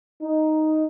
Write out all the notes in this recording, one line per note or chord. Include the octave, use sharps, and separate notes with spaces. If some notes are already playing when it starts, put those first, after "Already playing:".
D#4